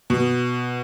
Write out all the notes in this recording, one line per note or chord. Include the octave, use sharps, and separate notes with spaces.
B2